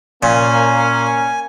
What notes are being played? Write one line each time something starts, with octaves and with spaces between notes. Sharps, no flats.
A#2 A#3 C#4 G#5